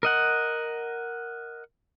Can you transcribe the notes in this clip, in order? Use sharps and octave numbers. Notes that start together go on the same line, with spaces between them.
A#4 D#5 F#5